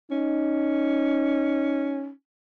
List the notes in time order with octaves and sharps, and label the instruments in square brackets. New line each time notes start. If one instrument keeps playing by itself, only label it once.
[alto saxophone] C#4 [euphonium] D#4